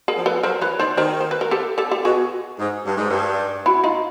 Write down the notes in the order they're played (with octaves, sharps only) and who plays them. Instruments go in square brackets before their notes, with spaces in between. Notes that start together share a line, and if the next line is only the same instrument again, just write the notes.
[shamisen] G#4 A#4
[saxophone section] F3
[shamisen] A4 B4
[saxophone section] F#3 [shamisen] A#4 C5
[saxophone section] E3 [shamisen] B4 C#5
[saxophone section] D#3 [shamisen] C5 D5
[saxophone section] D#3 [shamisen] A#4 C5
[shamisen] C5
B4
A#4
G4 A4
G4 A4
G4 A4
[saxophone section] B2 [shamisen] F#4 G#4
[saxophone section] G#2
G2
G#2
G2
[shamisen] E4 F#4
D#4 F4